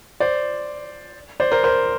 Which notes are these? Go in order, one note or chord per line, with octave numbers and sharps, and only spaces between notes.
C5 D5
C5 D5
A#4 C5
A#4 C5